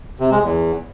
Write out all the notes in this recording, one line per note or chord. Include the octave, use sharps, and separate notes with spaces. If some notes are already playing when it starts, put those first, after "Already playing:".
C3
G#3
E2